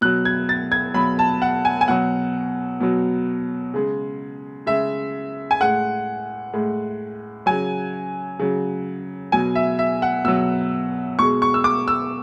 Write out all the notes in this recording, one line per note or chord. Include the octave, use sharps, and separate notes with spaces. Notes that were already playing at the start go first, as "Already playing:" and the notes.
B2 F#3 F#6
G#6
A6
G#6
B2 F#3 B5
A5
F#5
G#5
G#5
B2 F#3 F#5
B2 F#3
C#3 G#3
C#3 G#3 E5
G#5
A2 G#3 F#5
A2 G#3
C#3 F#3 G#5
C#3 F#3
B2 F#3 G#5
E5
E5
F#5
B2 F#3 E6
B2 G#3 C#6
C#6
E6
D6
E6